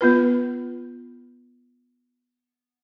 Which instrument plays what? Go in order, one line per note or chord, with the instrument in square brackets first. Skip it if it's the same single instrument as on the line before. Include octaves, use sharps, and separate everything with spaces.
[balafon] B3 F4 B4